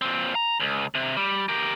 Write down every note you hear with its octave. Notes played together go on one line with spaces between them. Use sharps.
A#2 C4
A#5
C#2
C3
G3
G4 A#4